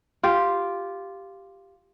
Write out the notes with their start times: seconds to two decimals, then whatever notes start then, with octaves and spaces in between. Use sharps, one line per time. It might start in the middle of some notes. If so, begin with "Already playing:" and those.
0.23 F4 G4